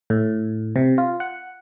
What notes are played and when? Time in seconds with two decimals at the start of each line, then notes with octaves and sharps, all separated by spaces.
0.10 A2
0.76 C3
0.98 F4
1.20 F#5